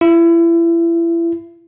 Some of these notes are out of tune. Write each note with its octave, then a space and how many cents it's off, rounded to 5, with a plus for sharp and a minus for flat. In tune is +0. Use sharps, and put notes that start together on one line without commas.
E4 +30